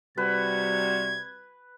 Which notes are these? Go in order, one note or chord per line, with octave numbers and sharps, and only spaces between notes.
C3 G3 F#4 B4 G#6